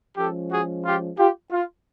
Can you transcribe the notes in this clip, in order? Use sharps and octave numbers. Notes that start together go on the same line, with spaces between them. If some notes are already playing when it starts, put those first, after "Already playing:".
F3 G#3 C#4 G4 A4
F#4 G#4
F4 G4
F4 G4
F4